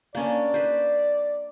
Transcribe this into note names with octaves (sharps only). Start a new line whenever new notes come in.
A#3 C#4 D4 D5
B4 C5